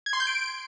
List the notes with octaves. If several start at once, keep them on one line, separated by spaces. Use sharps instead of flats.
G#6
C6
G6
D7